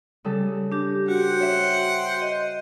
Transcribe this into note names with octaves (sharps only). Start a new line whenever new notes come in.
C#3 G3 A4
D4 G4
F#4 C5 F#5 G5
C#5 E5
D#5